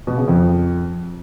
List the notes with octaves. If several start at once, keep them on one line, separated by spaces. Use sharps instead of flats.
B2
C#3
F2